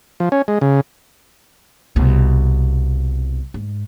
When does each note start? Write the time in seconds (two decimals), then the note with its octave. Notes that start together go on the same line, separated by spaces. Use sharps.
0.20 F3
0.32 C#4
0.48 G#3
0.62 C#3
1.96 C2 B2
3.54 G#2